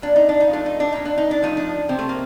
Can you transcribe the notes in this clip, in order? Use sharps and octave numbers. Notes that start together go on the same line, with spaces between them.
A#2 D4
D#4
D4
D#4
F3 A3 D4
D#4
D4
A#2 D#4
D4
D#4
D4
F3 A3 D#4
D4
C3 C4
A3
A#3